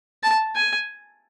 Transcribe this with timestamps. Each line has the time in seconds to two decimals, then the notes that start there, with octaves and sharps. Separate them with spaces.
0.23 A5
0.56 G#5